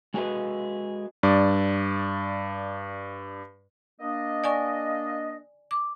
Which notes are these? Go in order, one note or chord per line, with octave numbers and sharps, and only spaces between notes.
G#3 F#4 G#4 A4 B4 D#5
G2 D5
A#3 D4 D#5
D5 G#5 C#6
D6